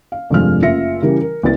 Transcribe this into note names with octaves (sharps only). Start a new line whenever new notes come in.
F5
F1 G2 C3 F3 G#3 F6
F#1 F4 E5 A#6 C#7
C#3 E3 G3 E4 A#4
A#4
C2 C3 B4 A6